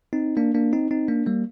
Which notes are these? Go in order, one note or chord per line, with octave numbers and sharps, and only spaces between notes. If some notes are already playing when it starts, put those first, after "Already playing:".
C4 D#4
A#3 D4
A#3 D4
C4 D#4
C4 D#4
A#3 D4
G3 A#3